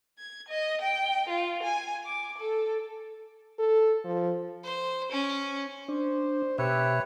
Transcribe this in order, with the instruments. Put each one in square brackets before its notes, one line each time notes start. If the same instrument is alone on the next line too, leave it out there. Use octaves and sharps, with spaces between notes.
[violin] G#6
D#5
G5
F4
G#5
D6
A4
[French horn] A4
F3
[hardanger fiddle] C5
C#4
[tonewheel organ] D4 [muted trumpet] C5
[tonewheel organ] B2 E5 [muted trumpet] G4 [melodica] B4 C#5